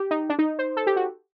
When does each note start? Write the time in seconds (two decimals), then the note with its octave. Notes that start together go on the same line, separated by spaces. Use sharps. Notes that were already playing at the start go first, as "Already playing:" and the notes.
Already playing: G4
0.11 D#4
0.29 D4
0.39 D#4
0.59 C5
0.77 A4
0.87 G4
0.96 F#4